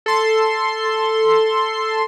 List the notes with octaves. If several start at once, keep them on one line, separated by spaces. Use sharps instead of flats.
A4 C6